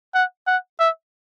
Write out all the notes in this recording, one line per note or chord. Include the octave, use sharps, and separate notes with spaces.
F#5
F#5
E5